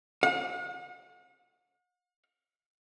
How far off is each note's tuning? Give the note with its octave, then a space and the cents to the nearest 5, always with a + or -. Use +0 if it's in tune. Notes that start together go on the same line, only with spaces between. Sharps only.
F#5 -45